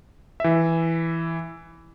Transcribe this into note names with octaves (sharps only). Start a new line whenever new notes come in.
E3 E5